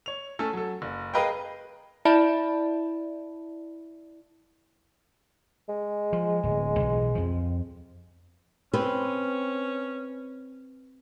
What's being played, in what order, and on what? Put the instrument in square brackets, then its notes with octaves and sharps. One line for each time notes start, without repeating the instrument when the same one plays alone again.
[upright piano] C#5 F7
A3 C#4 A4 G#5
F#3 A4
F#1
G#4 A#4 B4 D#5 F5 G5
[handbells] E4 D5 E5 A5 B5
[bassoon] G#3
[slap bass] F3
D1
B1 E3
F2 F3
[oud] C4 [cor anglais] C#4 [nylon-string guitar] B4